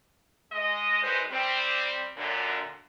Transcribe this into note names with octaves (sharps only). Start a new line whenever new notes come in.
G#3 D#5
F#2 G3 G#3 D#4 B4 C5
G3 C4
F#2 A#2 D3